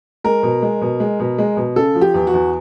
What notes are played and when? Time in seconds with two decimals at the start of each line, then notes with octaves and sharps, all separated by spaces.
0.24 G#3 A#4
0.43 B2
0.62 G#3
0.82 B2
1.00 G#3
1.20 B2
1.38 G#3
1.57 B2
1.76 C#3 A4
1.95 F3
2.01 G4
2.14 E2
2.27 F#4
2.33 E2